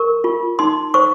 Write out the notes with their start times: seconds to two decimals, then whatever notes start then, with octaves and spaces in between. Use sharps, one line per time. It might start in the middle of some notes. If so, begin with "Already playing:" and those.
Already playing: A#4 C#6
0.24 F4
0.59 D#4 C6
0.94 C5 C#6